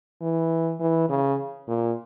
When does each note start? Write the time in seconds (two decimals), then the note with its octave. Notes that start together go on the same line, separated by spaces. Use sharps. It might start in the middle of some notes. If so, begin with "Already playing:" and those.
0.21 E3
0.80 E3
1.10 C#3
1.68 A#2